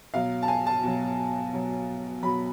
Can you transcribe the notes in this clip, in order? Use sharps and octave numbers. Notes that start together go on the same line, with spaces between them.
B2 F#3 F5
A5
G#5
A5
B2 F#3
B2 F#3
B2 F#3 B5